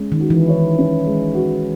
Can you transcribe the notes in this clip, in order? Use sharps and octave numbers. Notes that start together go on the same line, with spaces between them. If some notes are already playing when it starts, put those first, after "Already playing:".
Already playing: G#3 C#4
D#3
F#4
E3
C#5
C#4
G#3
F#4